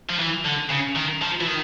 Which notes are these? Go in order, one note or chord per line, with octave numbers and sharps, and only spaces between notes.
F3
E3
D3
C#3
D#3
F3
E3
D#3